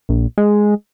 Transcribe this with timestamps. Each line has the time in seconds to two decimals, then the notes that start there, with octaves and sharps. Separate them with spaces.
0.09 A#1
0.38 G#3